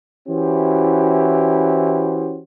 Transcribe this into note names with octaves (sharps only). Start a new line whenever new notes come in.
E3 C#4 E4 F#4 G4 C5